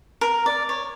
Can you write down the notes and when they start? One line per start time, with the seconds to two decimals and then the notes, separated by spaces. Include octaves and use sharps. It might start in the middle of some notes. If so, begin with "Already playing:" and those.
0.21 A#4
0.46 D5
0.69 C#5